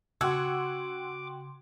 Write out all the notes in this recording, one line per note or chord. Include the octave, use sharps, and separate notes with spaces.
C#3 F#4 F#5 G5 C6 D6 E6 G#6